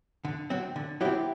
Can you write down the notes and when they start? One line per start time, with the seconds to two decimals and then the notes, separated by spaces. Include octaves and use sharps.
0.25 D3
0.50 F#3 C4
0.76 D3
1.01 F#3 C4 E4 G4